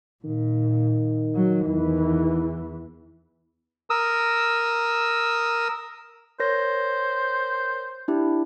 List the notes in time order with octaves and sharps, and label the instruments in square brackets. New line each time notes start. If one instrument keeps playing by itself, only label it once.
[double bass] A#2 [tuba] D#3
[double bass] F#3
E2 E3
[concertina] A#4 D#6 E6
[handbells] A#4 C#5 A#6 [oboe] C5
[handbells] D4 E4 G4